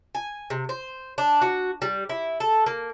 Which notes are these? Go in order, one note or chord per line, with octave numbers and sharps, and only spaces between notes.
G#5
C3
C5
D4
F#4
G3
E4
A4
A#3